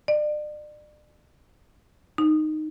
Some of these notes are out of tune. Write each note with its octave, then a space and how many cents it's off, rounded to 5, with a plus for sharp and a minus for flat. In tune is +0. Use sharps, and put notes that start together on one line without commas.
D5 +35
D#4 -10